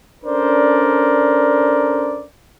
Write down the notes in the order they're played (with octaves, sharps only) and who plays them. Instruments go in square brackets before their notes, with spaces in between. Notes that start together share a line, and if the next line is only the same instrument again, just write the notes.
[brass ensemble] C#4 D4 A4 A#4 C5 D5